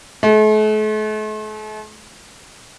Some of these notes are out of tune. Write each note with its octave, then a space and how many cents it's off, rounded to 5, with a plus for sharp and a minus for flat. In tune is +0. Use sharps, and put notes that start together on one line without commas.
A3 -45